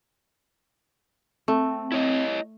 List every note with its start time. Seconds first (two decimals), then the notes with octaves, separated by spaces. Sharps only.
1.48 A3 C4
1.92 E4 C#5 D#5